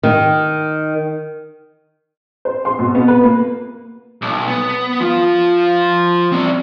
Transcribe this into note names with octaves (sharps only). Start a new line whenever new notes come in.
D#3
C5
C6
B2
B3
B4
A#3
B1
B3
F3 F4
C4 D5